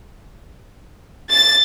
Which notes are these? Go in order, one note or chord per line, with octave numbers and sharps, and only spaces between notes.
A6